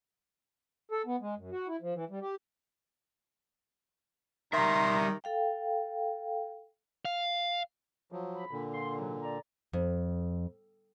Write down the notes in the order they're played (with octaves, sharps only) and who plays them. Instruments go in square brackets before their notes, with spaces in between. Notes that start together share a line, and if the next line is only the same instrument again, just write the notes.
[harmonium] A4
B3
G#3
F#2
F#4
E4
F3
E3
G3
G4
[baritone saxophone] D#3 [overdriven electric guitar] G3 E5 [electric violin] A#5 [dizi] C6
[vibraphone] A4 F5 G5
[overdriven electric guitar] F5
[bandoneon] F3 F#3
[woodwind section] B5
[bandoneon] A#2 D3
[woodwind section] F4 C6
G#2 C3 F#3
D5 A#5
[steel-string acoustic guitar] F2